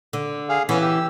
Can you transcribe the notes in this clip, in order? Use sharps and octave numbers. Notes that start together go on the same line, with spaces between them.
D3
G#4 F5
E3 B3 C#4
G4 E6